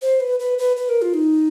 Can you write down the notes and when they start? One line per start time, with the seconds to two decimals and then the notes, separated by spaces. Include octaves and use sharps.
0.02 C5
0.20 B4
0.40 B4
0.58 B4
0.77 B4
0.89 A#4
1.02 F4
1.14 D#4